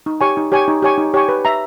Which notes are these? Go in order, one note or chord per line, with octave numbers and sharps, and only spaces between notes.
D#4
G4 C#5 G#5 C#6
D#4
G4 C#5 G#5 C#6
D#4
G4 C#5 G#5 C#6
D#4
G4 C#5 G#5 C#6
B4
E5 A#5